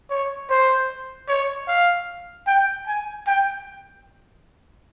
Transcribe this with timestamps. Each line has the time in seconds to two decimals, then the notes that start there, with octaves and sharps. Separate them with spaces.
0.10 C#5
0.50 C5
1.28 C#5
1.68 F5
2.47 G5
2.87 G#5
3.27 G5